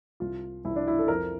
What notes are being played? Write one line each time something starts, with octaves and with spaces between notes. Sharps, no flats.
C2 F4
C2 E4
D4
E4
A4
F2 A#4